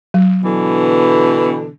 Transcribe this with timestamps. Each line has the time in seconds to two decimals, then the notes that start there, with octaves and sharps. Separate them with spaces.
0.14 F#3
0.44 B2 D3 E3